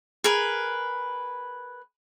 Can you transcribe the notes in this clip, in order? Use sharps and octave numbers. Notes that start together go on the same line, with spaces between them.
G#4 A#4 B4